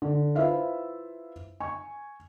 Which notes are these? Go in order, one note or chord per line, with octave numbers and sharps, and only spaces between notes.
D3
E4 F4 B4 C5 E5 F5
G#5 C#6